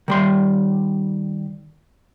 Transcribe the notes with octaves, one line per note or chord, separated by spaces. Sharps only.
D#3 G3 C6